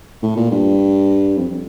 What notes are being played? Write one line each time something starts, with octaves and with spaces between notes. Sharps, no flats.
A2
A#2
G2
F2